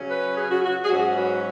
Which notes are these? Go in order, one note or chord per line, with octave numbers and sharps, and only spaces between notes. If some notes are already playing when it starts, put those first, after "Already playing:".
Already playing: C#3 F#3 C#4
B4
G#4
F#4
F#4
G#4
G#2 F#3 C#4 F#4
B4